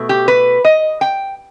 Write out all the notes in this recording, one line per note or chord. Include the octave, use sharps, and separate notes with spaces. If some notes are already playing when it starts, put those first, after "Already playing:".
Already playing: B2 A3
G4
B4
D#5
G5